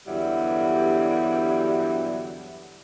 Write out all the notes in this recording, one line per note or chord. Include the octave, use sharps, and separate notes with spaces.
E2 G2 D3 F#3 G3 E4